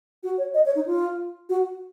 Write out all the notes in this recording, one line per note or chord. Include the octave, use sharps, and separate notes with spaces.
F#4
C#5
D#5
C#5
D#4
F4
F#4